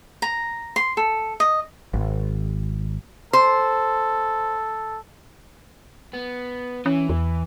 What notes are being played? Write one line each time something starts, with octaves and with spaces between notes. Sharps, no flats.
A#5
C6
A4
D#5
G#1
A4 C5
B3
E3 C#4
E2